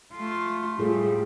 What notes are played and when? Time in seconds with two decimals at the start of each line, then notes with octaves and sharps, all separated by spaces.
0.13 A3 F4
0.79 A2 G3 F4 G#4 A4